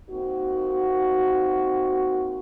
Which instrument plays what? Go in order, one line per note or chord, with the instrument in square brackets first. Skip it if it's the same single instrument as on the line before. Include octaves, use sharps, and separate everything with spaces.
[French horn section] A#3 C4 D#4 F#4